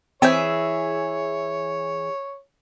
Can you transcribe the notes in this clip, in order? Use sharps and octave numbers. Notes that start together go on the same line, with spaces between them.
E3 C4 G#4 C5 C#5 E5